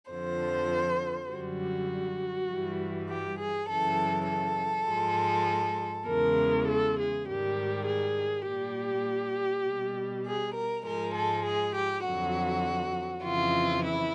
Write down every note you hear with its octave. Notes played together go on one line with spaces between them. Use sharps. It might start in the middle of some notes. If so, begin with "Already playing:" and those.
F2 D3 F3 C5
F#2 D3 G3 F#4
G2 E3 G3
G4
G#4
F#2 C#3 E3 A4
A4
G#2 F3 G#3
E2 C#3 E3 G#3 A#4
A4
G#4
G#2 D#3 G3 G4
G#4
A#2 G3 G4
B2 G3
G#4
A#4
G#2 F3 G#3 A#4
A4
G#4
G4
F2 D3 F#3 F#4
F2 C#3 E3 F4
E4